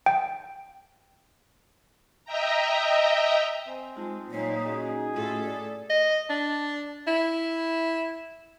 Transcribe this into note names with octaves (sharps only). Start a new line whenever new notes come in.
G5
D#5 E5 G5 A#5
C4 C5 G#5
G#3 D#4 F4 A5
A#2 F#3 A#3 D#4 C#5 G#5
C#4 F#4 G#4 D#5
A2 F4 A4
D5
D#5
D4
E4